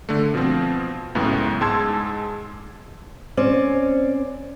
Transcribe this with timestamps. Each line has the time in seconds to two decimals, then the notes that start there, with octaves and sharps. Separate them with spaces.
0.09 D3 A3
0.34 B2 F3 C4
1.15 C#2 F#2 A2 B3
1.61 G#2 G#3 A5 C6 E6 G#6
3.37 C4 C#4 D5